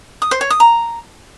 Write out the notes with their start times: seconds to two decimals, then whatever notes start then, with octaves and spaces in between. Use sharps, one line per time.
0.22 D#6
0.31 C5
0.41 C#5
0.50 D#6
0.60 A#5